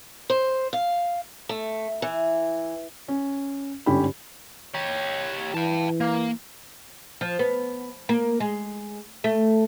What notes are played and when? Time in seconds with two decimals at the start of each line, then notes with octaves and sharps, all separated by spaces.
0.30 C5
0.73 F5
1.49 A3
2.02 E3
3.08 C#4
3.86 G1 G#2 D3 C#4 G4 B5
4.74 G4 C#5
5.54 E3 G5 A5
6.00 A#3
7.21 F3
7.39 B3
8.09 A#3
8.40 G#3
9.24 A3